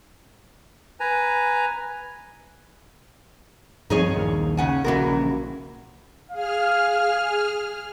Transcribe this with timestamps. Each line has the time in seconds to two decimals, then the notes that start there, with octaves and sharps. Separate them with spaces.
1.00 B4 G#5 A#5
3.90 G2 F3 C4 D#4 G#4 C#5
4.16 A#1 D#2 A#2
4.57 C#3 F#5 G#5
4.84 A#1 A#2 C#3 E3 F#4 A#4
6.31 G#4 F5 F6